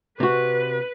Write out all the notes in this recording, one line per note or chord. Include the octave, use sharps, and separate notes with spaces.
C3 F#4 B4